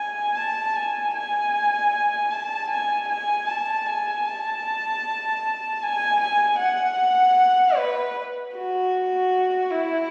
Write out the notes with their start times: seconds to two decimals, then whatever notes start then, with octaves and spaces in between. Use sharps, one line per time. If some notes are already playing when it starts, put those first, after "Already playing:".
Already playing: G#5
0.36 A5
0.76 G#5
1.15 G#5
2.31 A5
2.71 G#5
3.09 G#5
3.48 A5
3.88 G#5
4.27 A5
5.83 G#5
6.21 G#5
6.60 F#5
7.78 B4
8.55 F#4
9.72 E4